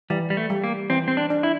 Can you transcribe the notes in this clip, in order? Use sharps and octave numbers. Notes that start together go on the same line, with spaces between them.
E3 G3
G3
A3
G3
A#3
E3 C4
C4
D4
D4
E4